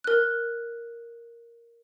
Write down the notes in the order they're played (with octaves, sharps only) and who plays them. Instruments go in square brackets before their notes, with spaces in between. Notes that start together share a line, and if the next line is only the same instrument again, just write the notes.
[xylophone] A#4 F#6